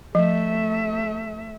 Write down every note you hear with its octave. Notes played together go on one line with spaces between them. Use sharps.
F3 A3 E5